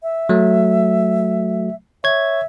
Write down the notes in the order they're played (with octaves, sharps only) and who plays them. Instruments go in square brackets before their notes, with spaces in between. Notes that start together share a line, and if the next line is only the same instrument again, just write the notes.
[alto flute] E5
[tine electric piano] F#3 A3
[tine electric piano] C#5 G#6 [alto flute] E5